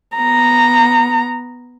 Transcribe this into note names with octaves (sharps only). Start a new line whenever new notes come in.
B3 A#5